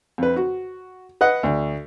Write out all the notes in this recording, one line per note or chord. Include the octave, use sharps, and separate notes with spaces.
F2 B4
F#4
B4 D#5 F#5
D2